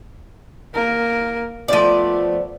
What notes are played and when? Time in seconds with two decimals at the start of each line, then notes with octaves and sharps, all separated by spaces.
0.74 A#3 A#4
1.68 F3 A3 B3 D5